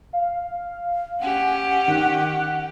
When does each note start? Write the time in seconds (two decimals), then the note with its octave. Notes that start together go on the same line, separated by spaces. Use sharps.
0.13 F5
1.20 C#4 G4 F#5 G#5
1.88 D#3 F#6